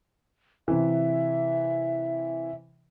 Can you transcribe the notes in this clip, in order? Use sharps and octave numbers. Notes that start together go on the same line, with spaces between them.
C3 E3 E5